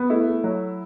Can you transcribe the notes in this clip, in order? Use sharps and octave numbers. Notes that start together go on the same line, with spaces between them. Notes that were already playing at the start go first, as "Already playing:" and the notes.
Already playing: B3
A3 E4
A3
F#3